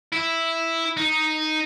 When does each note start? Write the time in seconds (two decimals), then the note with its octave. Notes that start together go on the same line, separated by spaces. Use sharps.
0.13 E4
0.97 D#4